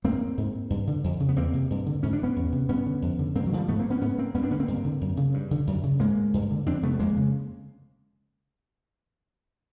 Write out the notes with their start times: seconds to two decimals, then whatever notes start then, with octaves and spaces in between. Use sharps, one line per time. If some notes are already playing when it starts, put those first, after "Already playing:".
0.04 G#2 A#3 C4
0.38 G#2
0.70 G2
0.87 D3
1.04 F2
1.20 C#3
1.29 B3
1.36 E2 A#3 C4
1.53 C3
1.70 G2
1.86 D3
2.03 G#2 C#4
2.13 D4
2.23 B3 C#4
2.36 E2
2.52 C3
2.69 G2 B3 C#4
2.86 D3
3.02 F2
3.19 D3
3.35 G2 A#3 C4
3.46 E3 F#3
3.52 D3
3.57 F3 G3
3.68 G#2 A3 B3
3.79 A#3 C4
3.90 B3 C#4
4.01 G#2 B3 C#4
4.18 A#3 C4
4.35 G2 B3 C#4
4.43 C4 D4
4.51 D3 B3 C#4
4.60 A#3 C4
4.68 G2
4.84 D3
5.01 F#2
5.17 C#3
5.34 G2
5.51 D3
5.67 F#2
5.83 C#3
6.00 G#2 G#3 A#3
6.34 G2
6.50 D3
6.66 F2 C4 D4
6.83 C3 A3 B3
6.93 A3
6.99 F2 G#3 A#3
7.16 C#3